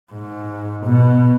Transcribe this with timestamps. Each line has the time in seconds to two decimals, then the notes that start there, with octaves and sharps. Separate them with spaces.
0.13 G#2
0.86 B2